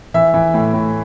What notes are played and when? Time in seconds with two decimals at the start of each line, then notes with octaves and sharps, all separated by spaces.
0.14 E3 E5
0.34 E3
0.54 A2
0.73 A2